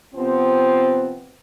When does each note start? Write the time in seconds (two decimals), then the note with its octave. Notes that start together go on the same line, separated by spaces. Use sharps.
0.14 C3 F3 B3 C4